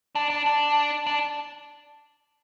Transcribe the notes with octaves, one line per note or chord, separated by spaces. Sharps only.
D4
D4
D4
D4